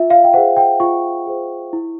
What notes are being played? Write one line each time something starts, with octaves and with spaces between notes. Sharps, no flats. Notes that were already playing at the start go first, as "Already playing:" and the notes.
Already playing: F4 E5
F5
G5
G#4 C5 F#5
G5
F4 C#6
G#4 C5
E4